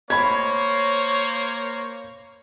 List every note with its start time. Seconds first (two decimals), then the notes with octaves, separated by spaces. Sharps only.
0.10 A#3 C5 C#5 B5 G#6